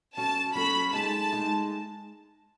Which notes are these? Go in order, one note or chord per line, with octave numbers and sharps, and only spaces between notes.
F#3 C#4 F#4 A4 A5
F#3 C#4 F#4 A4 B5
G#3 D#4 G#4 A5
G#3 D#4 G#4